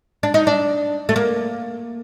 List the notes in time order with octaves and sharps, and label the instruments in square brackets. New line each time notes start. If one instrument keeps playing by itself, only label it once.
[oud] D4
D#4
D4
A3
A#3